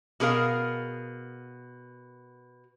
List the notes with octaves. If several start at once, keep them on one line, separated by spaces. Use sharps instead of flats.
B2 G#4 A#4 F5